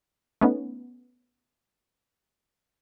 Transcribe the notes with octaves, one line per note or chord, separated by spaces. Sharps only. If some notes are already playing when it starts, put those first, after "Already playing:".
A3 B3 C#4 D#4